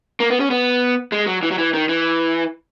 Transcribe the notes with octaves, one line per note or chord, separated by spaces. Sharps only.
A#3
B3
C#4
B3
G#3
F#3
E3
F#3
E3
D#3
E3